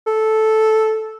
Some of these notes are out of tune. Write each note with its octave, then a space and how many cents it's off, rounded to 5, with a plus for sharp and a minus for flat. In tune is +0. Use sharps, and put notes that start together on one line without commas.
A4 -5